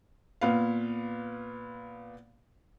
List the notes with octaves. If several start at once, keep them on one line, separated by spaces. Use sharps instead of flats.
A#2 B3 F5